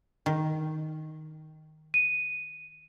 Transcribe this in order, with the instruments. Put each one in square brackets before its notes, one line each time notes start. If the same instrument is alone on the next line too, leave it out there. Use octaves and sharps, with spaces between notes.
[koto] D#3
[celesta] D#7